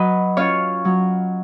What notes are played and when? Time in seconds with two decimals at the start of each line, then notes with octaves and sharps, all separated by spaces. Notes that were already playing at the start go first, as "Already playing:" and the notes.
Already playing: F#3 B4 D#5
0.37 C#4 F4 C#5 F5
0.85 F#3